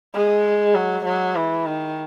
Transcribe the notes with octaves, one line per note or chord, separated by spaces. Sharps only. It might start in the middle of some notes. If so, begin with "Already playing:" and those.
G#3
F#3
F#3
E3
D#3